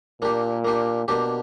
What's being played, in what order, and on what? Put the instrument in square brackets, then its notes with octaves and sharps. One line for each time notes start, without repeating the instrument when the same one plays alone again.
[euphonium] A#2 [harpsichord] A#3 D4 G4
[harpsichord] A#3 D4 G4
[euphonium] B2 [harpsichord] A#3 D4 G4